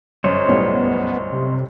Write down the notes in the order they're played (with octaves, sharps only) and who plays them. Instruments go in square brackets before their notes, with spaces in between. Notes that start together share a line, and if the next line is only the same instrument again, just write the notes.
[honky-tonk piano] G1 F#2 [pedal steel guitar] C5 C#5 D#5
[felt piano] B1 A2 G3 [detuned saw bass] B3
[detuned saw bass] C3